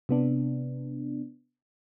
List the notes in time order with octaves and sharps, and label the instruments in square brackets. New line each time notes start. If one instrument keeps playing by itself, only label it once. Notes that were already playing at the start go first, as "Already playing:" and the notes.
[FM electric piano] C3 B3 D4